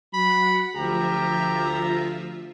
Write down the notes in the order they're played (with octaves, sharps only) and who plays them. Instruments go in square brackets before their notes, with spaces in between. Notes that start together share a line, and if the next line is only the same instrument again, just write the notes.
[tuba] F#3 [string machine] F#5 [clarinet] B5
[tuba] D2 [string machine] F3 F4 E5 [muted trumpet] G4 [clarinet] A#5